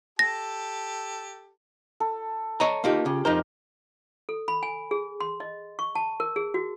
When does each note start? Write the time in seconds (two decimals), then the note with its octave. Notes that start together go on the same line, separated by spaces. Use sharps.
0.19 G4 A4 A5 A#6
2.00 A4
2.60 C#5 D#5 A#5
2.84 A#3 D#4 F4 G4
3.06 C#3 G4
3.25 F2 D#4 A#4 C5
4.29 A4
4.48 B5
4.63 G#5
4.91 G#4
5.20 C6
5.40 D#5
5.79 C#6
5.95 A5
6.20 A#4
6.36 G#4
6.54 F#4